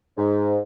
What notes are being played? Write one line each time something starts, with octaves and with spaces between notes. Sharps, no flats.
G#2